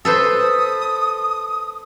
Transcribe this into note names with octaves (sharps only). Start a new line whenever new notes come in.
A4 B4 C5 D#6